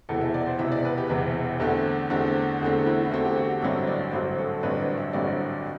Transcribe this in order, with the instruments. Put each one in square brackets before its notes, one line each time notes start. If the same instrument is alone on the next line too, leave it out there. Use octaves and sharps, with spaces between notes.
[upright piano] E1 E2 C3 E3 A4
E5
D5
C5
E1 E2 C3 E3 E5
D5
B4
G4
E1 E2 C3 E3
E2 D3 A3 C4 G4
E2 D3 A3 C4 G4
E2 D3 A3 C4
E4
E4
E2 D3 A3 C4 F#4
G4
F#4
G4
A1 G2 D3 F#3 C4 E5
D5
A1 G2 D3 F#3 C4 C5
A4
A1 G2 D3 F#3 C4 B4
D5
E5
A1 G2 D3 F#3 C4 D5